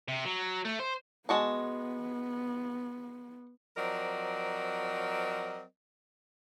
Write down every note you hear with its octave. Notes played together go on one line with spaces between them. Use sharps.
C3
F#3
A3
C5
G#3 B3 F#4 A5
F3 F#3 C4 A#4 D5 D#5